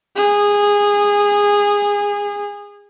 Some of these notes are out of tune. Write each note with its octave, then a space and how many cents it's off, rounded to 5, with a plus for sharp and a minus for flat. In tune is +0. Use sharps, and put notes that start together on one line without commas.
G#4 -20